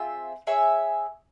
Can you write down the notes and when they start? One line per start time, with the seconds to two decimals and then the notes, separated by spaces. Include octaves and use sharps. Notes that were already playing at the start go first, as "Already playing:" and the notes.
Already playing: C4 F4 G#4 E5
0.47 G#4 C#5 E5 G#5